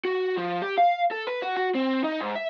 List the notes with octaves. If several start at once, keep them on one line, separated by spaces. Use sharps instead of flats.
F#4
F3
G4
F5
A4
B4
F#4
F#4
C4
D#4
G#2
E5